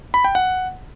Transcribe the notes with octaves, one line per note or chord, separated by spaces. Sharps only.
B5
G5
F#5